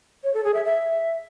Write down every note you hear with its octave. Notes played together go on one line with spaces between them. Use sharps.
C#5
A4
G#4
E5
E5